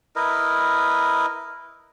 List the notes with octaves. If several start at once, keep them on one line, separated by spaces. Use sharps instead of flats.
E4 A#4 B4 D#5